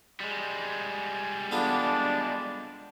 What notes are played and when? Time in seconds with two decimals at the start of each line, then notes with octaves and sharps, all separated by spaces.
0.20 G3 G#3
1.51 B3 D4 F4 A4